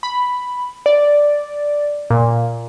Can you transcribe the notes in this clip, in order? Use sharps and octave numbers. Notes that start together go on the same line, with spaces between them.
B5
D5
A#2